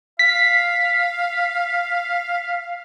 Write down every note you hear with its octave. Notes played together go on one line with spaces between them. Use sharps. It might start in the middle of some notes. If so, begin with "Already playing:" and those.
F5 B6